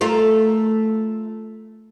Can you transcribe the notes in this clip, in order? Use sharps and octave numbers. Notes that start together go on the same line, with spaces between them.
A3 F4 A#4